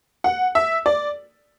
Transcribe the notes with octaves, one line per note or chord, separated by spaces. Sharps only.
F#5
E5
D5